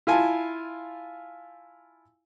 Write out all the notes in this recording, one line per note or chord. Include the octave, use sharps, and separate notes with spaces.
E4 F4 G#5 A5